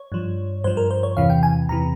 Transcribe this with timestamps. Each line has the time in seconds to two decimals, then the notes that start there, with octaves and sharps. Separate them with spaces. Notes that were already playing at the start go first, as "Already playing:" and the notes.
Already playing: C#5
0.12 G2 F3
0.64 G2 F3 C5
0.77 A#4
0.91 C5
1.03 C#5
1.17 E2 C3 E3 F5
1.30 G5
1.43 G#5
1.69 E2 C3 E3 A#5